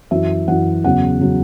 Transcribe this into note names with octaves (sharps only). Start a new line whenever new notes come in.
F#2 E3 E5
F#2 E3 F#5
E2 C#3 F#3 F#5
C#3 F#3